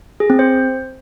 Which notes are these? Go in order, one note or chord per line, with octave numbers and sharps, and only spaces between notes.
G#4
C4
C5